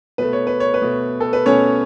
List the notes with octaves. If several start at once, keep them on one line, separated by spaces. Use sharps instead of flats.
B2 A3 B4
C#5
B4
C#5
B4
B2 A3
A4
B4
B2 A3 C#4 C#5